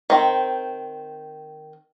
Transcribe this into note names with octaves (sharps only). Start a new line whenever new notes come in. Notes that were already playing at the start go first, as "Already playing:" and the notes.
D#3 C4